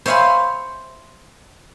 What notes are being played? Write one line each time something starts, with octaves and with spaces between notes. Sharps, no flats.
C5 C#5 E5 F5 G#5 B5